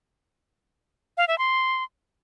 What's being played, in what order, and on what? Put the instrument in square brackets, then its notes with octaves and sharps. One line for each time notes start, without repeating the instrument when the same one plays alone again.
[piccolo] F5
E5
C6